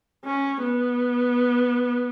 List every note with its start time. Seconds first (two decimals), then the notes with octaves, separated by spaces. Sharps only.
0.25 C#4
0.63 B3